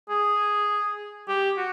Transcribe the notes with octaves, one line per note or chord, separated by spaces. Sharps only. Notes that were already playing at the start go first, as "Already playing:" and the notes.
G#4
G4
F#4